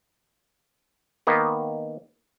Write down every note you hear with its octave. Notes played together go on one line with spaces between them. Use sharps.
D#3 A#3 B3